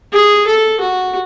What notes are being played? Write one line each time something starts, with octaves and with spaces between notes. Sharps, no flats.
G#4
A4
F#4